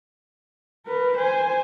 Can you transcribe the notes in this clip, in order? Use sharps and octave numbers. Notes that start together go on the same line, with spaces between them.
A#4 B4
C5 G#5